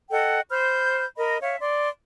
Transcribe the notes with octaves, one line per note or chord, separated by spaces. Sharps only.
A4 D#5 F#5 G5
C5 B5 F6 G6
A#4 D#5 B5
C#5 E5 F5
D5 C6